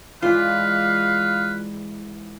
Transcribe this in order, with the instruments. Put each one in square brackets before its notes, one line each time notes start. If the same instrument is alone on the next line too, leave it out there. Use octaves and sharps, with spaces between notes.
[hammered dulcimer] G#2 E3 D5 [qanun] F4 [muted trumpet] B4 [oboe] F5